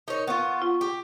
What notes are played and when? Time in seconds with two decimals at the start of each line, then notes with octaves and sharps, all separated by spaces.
0.08 D#4 A#4 C#5
0.27 B3 F4 C#6
0.62 F4
0.81 G4